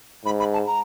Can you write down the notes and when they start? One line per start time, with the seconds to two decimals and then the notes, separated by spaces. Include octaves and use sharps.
0.25 G#2 B5
0.39 B5
0.53 A5
0.67 A#5